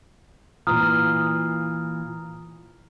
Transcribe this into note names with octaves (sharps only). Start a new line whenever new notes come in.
A#2 E3 F4 A#5 D#6 F6